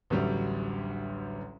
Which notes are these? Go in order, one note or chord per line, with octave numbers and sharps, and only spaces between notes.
A1 D2 F#3 G3